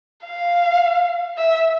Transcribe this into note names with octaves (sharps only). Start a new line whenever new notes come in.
F5
E5